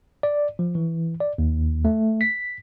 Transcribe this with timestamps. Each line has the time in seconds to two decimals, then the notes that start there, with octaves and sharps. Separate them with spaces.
0.23 D5
0.59 F3
0.75 E3
1.20 D5
1.38 D#2
1.85 A3
2.21 B6